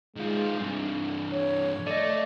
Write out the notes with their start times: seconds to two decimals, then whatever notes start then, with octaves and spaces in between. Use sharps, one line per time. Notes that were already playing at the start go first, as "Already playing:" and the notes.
0.17 D#3 G#3 F4
0.58 G2 E3 D4
1.32 C#5
1.87 A3 D5 D#5